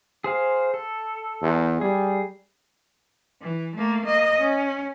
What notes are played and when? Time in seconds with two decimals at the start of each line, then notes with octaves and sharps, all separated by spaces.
0.24 G#4 C5 F5
0.74 A4
1.42 E2
1.81 G3 G#4
3.41 E3
3.76 A3 A#3
4.05 A#3 D#5
4.41 C#4